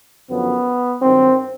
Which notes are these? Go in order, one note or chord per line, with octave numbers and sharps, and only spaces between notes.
F#2 D3 F3 B3
G2 D#3 F#3 C4